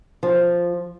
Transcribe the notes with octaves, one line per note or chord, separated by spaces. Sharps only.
F3